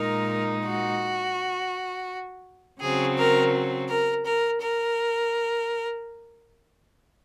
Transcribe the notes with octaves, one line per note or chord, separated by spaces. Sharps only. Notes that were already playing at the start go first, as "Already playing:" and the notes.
Already playing: A#2 G#3 D#4 A#4
F#4
C#3 F#3 C4 G#4
A#4
A#4
A#4
A#4